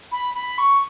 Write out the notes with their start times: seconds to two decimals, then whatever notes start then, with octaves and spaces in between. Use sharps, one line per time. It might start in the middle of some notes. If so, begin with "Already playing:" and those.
0.12 B5
0.35 B5
0.58 C#6